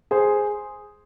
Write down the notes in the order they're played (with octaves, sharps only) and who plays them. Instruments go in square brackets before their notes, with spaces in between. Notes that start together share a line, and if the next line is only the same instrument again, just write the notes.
[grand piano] G#4 C5